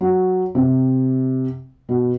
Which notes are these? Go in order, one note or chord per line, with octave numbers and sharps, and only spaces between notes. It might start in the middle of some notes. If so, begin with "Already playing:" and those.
F#3
C3
B2